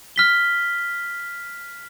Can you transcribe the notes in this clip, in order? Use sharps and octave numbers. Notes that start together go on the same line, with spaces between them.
F6 B6 G7